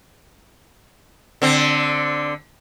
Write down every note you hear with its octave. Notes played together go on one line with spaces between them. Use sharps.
D3 C4